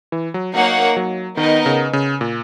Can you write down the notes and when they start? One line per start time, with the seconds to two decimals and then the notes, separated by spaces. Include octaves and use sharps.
0.12 E3
0.34 F#3
0.55 F#3 A#3 D#4 A#4 C#5 F#5
0.97 F#3
1.37 D#3 B3 D#4 A#4 D#5
1.66 C#3
1.93 C#3
2.21 A#2